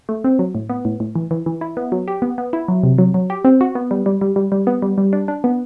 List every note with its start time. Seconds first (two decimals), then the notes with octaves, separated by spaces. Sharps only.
0.09 A3
0.24 C4
0.39 F#3
0.55 A2
0.70 B3
0.85 A2
1.00 A2
1.16 E3
1.31 E3
1.46 E3
1.61 E4
1.77 B3
1.92 F#3
2.08 G4
2.22 B3
2.38 B3
2.53 E4
2.68 F#3
2.83 C3
2.98 F#3
3.14 F#3
3.30 G4
3.44 C4
3.61 F#4
3.75 B3
3.91 G3
4.06 G3
4.21 G3
4.36 G3
4.52 G3
4.67 B3
4.82 G3
4.98 G3
5.13 D4
5.28 D4
5.44 B3